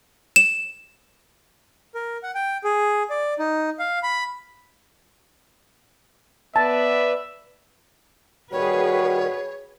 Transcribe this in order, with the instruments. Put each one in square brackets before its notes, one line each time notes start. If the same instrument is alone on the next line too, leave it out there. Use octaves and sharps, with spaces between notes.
[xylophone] E7
[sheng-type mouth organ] A#4
F#5
G5
G#4
D5
D#4
F5
B5
[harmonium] B3 B4 D5 [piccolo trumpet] E5 [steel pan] A5
[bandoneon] D#3 G3 [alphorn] F#4 [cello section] G#4 B4 [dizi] C#5